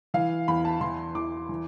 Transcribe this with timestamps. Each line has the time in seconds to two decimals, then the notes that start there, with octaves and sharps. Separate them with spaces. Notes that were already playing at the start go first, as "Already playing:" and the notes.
0.14 E3 F5
0.48 E2 B5
0.65 A5
0.81 E3 C6
1.15 E2 D6
1.49 E3